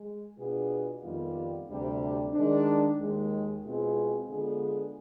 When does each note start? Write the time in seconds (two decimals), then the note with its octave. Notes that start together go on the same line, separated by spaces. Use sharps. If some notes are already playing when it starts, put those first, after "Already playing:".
Already playing: G#3
0.38 B2 B3 D4 F4 G#4
1.03 F2 D#3 G3 B3 F4
1.68 D2 C3 G3 D4 G4
2.33 D#3 G#3 D4
2.99 D#2 D#3 G#3
3.64 B2 G#3 C4 F4 G#4
4.29 D3 G#3 B3 F4 G#4